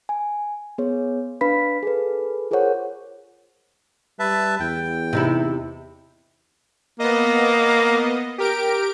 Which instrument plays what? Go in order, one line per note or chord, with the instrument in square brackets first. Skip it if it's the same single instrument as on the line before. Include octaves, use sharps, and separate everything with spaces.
[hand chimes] G#5
B3 G#4 C#5
D4 B4 F5 B5 B6
G#4 A4 B4
F4 G#4 A#4 C5 C#5 F#5
[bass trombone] G3 [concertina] B4 E5 A5
[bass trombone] E2 [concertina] G5
[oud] C3 D#4 E4
[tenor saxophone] A#3 [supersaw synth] B3 D#5
[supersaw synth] G4 A#4 D7